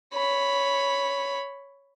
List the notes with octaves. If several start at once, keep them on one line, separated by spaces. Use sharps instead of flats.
C#5 B5